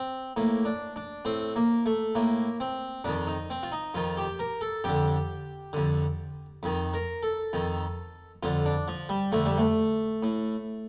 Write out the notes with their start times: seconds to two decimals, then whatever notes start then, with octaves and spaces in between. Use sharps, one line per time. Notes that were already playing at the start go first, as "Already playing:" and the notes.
Already playing: C4
0.37 A2 A#3
0.65 D4
0.96 D4
1.25 A2 C4
1.56 A#3
1.86 A3
2.15 A2 A#3
2.60 C4
3.04 F2 D#3 D4
3.27 D#4
3.50 C4
3.63 F4
3.72 D#4
3.94 F2 D#3 F4
4.17 G4
4.39 A#4
4.61 A4
4.84 F2 D3 G4
5.73 F2 D3
6.63 F2 D#3
6.94 A#4
7.23 A4
7.53 F2 D#3
8.43 F2 D3 F4
8.66 D4
8.88 F3
9.09 G3
9.32 F2 D3 A3
9.46 G3
9.58 A3
10.23 A2